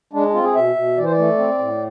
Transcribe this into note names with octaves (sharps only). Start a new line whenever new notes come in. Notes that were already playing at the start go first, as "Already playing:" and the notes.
G#3 D4
C4 F4
G#4
B2 E5
B2
E3 D5
C5
D5
A3
C4
A2